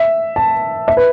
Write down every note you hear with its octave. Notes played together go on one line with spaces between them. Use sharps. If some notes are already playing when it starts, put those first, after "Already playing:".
Already playing: E5
A5
E5
B4